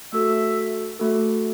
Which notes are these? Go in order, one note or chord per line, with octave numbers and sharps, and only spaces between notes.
A3 F#4 A4 E5
A3 F#4 A4